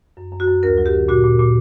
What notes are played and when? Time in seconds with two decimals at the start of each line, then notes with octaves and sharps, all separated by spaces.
0.17 F#2
0.32 F#2
0.40 F#4
0.47 F#2
0.63 D2 A#4
0.78 F#3
0.86 G4
0.93 D3
1.08 A#2 F#4
1.24 A#2
1.39 A#2